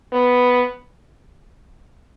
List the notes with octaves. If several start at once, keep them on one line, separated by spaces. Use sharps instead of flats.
B3